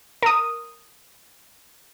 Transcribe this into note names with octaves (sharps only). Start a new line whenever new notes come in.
A#4 D#6